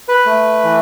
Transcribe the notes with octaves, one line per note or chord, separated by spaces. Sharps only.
B4
A3
E3